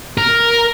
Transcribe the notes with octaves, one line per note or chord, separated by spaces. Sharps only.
A#4